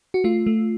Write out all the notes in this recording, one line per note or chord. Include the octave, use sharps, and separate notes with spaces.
F#4
A3 F4
A3